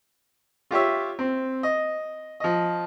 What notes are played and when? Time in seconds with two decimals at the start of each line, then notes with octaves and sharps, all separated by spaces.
0.71 F4 G4 C#5 E5
1.19 C4
1.63 D#5
2.40 F3 D#5